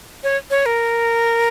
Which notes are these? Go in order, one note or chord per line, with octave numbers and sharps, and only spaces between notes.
C#5
C#5
A#4